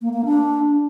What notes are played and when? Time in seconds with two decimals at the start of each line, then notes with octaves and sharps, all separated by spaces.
0.02 A#3
0.13 A#3
0.25 D4